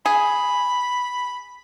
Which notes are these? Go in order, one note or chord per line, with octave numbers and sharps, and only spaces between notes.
G#4 B5